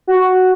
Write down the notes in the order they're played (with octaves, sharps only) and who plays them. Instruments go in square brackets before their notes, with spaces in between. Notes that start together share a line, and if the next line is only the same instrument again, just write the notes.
[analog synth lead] F#4